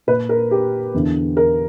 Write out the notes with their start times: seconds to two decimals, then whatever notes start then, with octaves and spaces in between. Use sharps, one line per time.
0.07 A#2 B4
0.29 A#4
0.51 G4
0.94 E2 D3
1.37 A#4